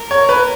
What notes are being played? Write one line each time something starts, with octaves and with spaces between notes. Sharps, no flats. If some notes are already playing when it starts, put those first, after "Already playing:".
Already playing: A#4
C#5
B4